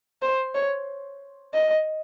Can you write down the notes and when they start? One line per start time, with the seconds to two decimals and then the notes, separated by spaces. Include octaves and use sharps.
0.22 C5
0.55 C#5
1.53 D#5